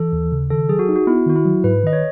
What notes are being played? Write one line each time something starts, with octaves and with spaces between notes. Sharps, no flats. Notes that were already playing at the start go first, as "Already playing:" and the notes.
Already playing: E3 A4
D#2
C#3
D#3 A4
F#3 G#4
F#4
D#4
F#4
B3 E4
D#3 F#4
E4
F#3
G#2 B4
D#3 D#5
C#5